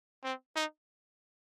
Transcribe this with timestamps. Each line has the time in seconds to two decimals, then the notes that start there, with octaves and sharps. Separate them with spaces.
0.24 C4
0.55 D#4